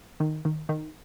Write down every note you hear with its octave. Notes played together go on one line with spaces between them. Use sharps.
D#3
D#3
D#3